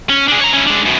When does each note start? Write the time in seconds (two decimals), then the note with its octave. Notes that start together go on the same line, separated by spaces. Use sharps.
0.10 C#4
0.28 D4 G#4
0.41 C#5 A#5
0.53 C#4 E4
0.67 G#3 D4
0.85 F#2 B2